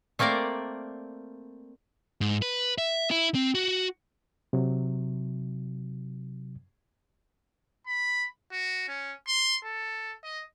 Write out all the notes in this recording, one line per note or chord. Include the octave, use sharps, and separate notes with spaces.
A3 A#3 C4 A#4 D5
G#2
B4
E5
E4
C4
F#4
C3 F#3
B5
F#4
C#4
C6
A4
D#5